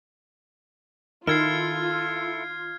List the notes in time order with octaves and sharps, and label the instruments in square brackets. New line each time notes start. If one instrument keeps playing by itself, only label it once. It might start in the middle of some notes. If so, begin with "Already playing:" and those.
[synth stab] D#3 [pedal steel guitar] E4 A4 [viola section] F4 [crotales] F6 G#6 C7